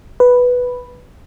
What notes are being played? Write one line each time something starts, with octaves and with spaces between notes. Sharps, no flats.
B4